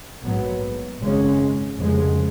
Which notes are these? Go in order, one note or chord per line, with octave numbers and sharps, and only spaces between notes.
A#1 G#2 F#3 B3
G#1 F#2 C#3 G#3 C#4
F1 F2 C#3 F3 G#3